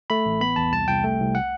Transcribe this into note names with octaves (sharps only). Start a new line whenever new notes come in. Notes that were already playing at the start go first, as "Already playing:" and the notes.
A3 B5
A1
B3 B5
E2 A5
C2 A5
C2 G5
A3
C2
F#5